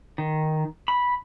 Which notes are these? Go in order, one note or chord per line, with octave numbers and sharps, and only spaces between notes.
D#3
B5